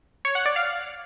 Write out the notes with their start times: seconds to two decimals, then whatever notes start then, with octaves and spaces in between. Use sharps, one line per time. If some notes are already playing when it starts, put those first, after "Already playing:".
0.25 C#5
0.35 F#5
0.46 D5
0.56 F5